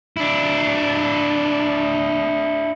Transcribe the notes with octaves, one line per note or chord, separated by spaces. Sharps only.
D4 E4